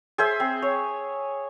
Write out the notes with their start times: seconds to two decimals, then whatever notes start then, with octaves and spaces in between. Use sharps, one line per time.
0.18 G#4 C5 E5
0.40 C4
0.62 C#5